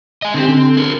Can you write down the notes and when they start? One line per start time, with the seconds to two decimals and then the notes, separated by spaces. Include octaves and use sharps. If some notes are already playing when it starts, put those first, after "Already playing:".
0.22 D#5 G#5
0.34 D3 C4 G4 C5
0.48 D3
0.77 G#4 A#4